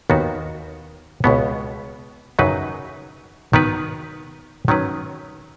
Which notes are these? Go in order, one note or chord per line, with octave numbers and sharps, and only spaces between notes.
D#2 D#3 B3 F#4
C#2 B2 B3
F#2 C#3 F#3 D#4 B4
D#3 B3 F#4 B4
D#3 F#3 C#4 B4